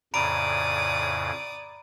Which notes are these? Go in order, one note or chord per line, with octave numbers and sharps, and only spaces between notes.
F2 A2 C#3 D5 A#5 B5 D#6 D7